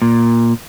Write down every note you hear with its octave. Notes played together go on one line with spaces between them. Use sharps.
A#2